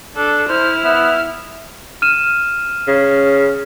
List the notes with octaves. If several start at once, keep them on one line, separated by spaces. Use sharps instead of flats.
D4 A4
E4 C5 F6
B3 E5
F6 D#7 E7
C#3